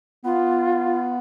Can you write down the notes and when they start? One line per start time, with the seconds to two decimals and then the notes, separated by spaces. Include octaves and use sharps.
0.25 B3 F4